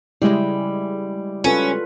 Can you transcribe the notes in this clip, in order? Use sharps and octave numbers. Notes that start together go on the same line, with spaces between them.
C#3 G3 G#3 E4
C#4 F4 A4 B4